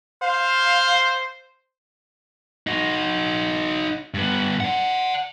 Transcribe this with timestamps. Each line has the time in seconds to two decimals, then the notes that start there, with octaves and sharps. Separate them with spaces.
0.22 C5 F5
2.67 D#4 F#4
4.14 G2 B3
4.60 D5 F#5